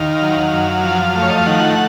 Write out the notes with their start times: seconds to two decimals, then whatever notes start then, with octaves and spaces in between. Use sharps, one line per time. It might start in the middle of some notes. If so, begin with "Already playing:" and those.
Already playing: D#2 D#3 F5
0.22 F#3
0.53 F#2
0.84 F3
1.15 A3
1.22 C#5
1.30 D#5
1.38 F5
1.46 D#3 F#5